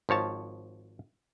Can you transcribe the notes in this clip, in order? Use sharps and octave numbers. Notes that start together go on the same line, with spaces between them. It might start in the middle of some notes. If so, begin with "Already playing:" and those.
G#1 F3 C#5 A5